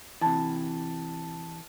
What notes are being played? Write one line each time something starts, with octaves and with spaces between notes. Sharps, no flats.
C3 E3 A5